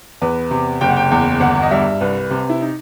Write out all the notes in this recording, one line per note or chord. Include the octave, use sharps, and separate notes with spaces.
E2 B4
C3
F#1 G5
F#5
G5
E2
G1 F#5
D#5
G2 E5
C2 B4
C3
E4
D#4